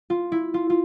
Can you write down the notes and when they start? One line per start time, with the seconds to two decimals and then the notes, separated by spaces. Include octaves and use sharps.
0.10 F4
0.32 E4
0.54 F4
0.70 F4